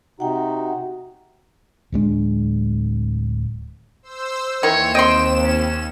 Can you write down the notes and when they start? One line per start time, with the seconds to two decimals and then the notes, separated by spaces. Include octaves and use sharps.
0.20 C3 D#4 F#4 F#5 G5
1.93 D1 G2 G#3 D4
4.03 C5 E6
4.63 D#2 D#3 E3 C#5 E7
4.95 C4 D#5 G5 C6
5.44 C#4